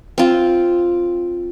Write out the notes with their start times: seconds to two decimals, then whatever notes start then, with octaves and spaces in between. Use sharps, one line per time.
0.18 C4 F4